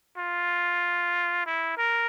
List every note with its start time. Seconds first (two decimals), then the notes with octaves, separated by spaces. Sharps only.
0.18 F4
1.46 E4
1.78 A#4